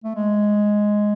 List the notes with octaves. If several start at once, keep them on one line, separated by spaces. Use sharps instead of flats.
A3
G#3